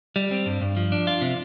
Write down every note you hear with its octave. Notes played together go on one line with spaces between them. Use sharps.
G3
C4
G2
G2
F3
D4
F4
C3